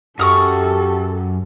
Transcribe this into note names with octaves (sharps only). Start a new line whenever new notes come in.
F#2 G4 A4 C#6 D#6 F6